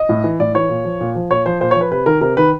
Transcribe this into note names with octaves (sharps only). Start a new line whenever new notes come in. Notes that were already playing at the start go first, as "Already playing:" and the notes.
Already playing: D#5
A2
E3
A2 D5
E3 C#5
A#2
F3
A#2
F3
A#2 C#5
F3 C5
A#2 C5
C#5
F3
B4
C3 B4
D#3 A#4
C3 A#4
D#3 B4